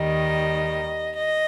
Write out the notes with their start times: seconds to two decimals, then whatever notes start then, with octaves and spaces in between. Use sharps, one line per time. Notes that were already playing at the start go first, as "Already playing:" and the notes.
Already playing: D#2 D#3 G3 D#5
1.17 D#5